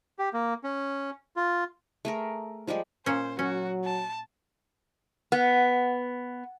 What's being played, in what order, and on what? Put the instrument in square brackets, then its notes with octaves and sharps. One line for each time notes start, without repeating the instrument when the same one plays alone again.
[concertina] G4
A#3
C#4
F4
[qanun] A3 G#4 A#4
F3 G3 G#3 G4
[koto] A#2 C#4 [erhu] C5
[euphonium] F#3 [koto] C#4 [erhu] F#4
[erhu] A5
[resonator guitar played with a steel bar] B3